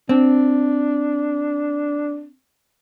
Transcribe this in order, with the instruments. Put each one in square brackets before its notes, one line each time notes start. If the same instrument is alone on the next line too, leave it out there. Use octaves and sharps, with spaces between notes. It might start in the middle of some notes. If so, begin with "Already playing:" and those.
[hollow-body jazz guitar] C4 [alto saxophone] D4